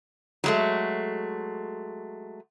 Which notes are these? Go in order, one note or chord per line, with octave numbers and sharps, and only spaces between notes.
F#3 G#3 A3